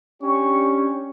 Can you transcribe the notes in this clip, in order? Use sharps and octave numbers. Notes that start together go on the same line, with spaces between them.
C#4 D4 G4 C#6